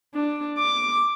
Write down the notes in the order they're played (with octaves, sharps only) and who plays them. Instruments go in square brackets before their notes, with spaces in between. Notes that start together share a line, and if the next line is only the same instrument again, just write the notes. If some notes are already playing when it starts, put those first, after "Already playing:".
[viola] D4
D6